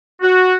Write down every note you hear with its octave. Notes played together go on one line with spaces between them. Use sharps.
F#4